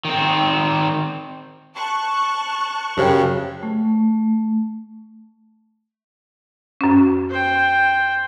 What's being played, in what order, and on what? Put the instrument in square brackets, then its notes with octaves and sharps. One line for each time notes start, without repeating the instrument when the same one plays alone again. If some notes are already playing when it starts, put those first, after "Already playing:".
[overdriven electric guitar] D#3 C4
[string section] A5 C#6 F#6
[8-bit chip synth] F#2 C#3 [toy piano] G4 C5 G5
[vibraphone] A3
[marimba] F#2 C#4
[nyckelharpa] C5 G5